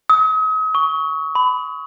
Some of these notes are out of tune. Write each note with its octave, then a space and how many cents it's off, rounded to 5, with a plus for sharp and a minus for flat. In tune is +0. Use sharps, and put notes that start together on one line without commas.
D#6 +40
C#6 +15
B5 +30